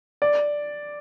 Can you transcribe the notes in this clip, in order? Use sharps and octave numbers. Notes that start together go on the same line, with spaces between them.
D5